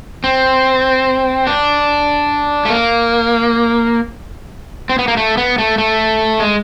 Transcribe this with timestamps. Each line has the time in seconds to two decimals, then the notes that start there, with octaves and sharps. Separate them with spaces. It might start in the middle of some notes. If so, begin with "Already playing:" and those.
0.24 C4
1.47 D4
2.65 A3
2.70 A#3
4.90 C4
4.99 B3
5.08 A#3
5.17 A3
5.37 B3
5.58 A3
5.78 A3
6.40 G#3